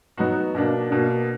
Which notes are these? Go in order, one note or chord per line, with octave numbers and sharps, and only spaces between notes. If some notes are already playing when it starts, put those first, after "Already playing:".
F#3 B3 D#4 F#4
B2 A#3 D4
B2 A#3 D4